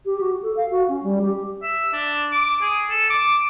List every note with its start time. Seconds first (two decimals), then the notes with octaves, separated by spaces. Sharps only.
0.05 G4
0.20 F#4
0.42 A4
0.56 F5
0.71 F#4
0.88 C#4
1.03 G3
1.22 G4
1.63 E5
1.93 D4
2.32 D6
2.61 G#4
2.90 A4
3.10 D6